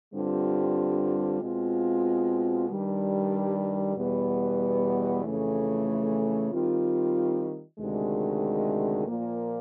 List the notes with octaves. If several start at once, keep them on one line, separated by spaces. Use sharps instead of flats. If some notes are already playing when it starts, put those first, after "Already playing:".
G2 D3 G3 C4 F4
B2 G#3 C4 F4
G2 D#3 G3
E2 B2 G3 B3
F2 C#3 E3 A3
D#3 G3 C4 F4
D2 C3 D#3 G#3
A#2 F3 A#3